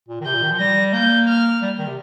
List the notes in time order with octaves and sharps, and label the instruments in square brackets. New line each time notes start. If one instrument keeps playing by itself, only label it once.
[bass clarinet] A#2
D#3
[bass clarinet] C3 [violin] G6
[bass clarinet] A#2
D#3
F3
[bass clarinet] G3 [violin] A#6
[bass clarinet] A#3 [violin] G6
[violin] F6
[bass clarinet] G3
D#3
C3